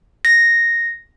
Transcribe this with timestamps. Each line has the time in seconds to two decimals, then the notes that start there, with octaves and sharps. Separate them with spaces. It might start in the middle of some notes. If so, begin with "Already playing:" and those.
0.25 A#6